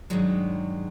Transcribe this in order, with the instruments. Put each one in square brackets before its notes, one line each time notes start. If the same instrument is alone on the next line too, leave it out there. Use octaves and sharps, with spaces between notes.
[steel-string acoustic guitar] G2 D#3 F#3 G#3